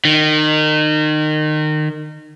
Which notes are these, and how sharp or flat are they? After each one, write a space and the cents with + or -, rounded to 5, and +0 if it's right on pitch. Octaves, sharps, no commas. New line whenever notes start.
D#3 -25